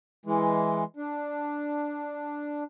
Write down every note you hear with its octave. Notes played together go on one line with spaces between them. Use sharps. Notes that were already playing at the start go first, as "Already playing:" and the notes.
E3 G#3
D4